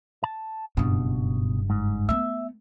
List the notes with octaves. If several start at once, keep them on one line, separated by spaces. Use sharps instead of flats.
A5
F#1 G2 B2
G#2
A3 B3 E5